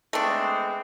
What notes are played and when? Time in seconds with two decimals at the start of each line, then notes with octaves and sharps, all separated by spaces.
0.13 G#3 A3 B3 C4 D4